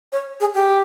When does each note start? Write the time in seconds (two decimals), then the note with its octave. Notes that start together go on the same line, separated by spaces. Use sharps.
0.12 C#5
0.40 G#4
0.54 G4